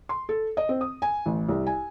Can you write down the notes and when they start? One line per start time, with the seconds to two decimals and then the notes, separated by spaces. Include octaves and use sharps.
0.09 C6
0.29 A4
0.57 D#5
0.69 C4
0.81 D#6
1.02 G#5
1.26 A1
1.48 C2
1.67 G#5